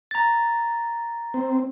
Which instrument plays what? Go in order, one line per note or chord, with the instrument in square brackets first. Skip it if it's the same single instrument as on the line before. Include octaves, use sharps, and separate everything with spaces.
[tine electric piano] A#5 A6
[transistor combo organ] C4